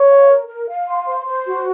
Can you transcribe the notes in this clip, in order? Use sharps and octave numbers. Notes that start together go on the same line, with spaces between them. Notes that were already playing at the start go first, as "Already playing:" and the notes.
Already playing: C#5
F5
A#4
A#4
F5
C6
C5
C5
F#4